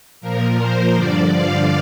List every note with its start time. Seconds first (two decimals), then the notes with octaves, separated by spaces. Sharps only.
0.21 A#2 F3 A#4
0.57 C5
0.94 G2 D3 F3 D5
1.31 F5